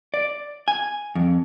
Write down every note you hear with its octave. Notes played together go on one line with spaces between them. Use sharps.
D5
G#5
F2